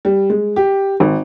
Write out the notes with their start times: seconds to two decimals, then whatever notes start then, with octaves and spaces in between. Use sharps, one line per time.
0.05 G3
0.30 G#3
0.56 G4
1.00 G#1